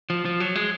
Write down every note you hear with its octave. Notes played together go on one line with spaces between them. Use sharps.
F3
F3
F#3
G#3